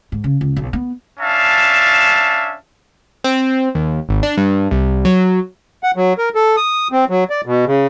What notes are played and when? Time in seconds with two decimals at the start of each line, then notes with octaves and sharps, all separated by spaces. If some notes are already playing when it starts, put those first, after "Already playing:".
0.12 G#2
0.24 C#3
0.41 C#2
0.56 B1
0.73 B3
1.19 C#4 D4 E5 F5 A5
3.24 C4
3.75 D#2
4.09 G#1
4.23 D4
4.38 G2
4.71 C2
5.05 F#3
5.83 F#5
5.96 F#3
6.18 A#4
6.35 A4
6.57 D#6
6.92 C4
7.09 F#3
7.30 D5
7.46 B2
7.66 C#3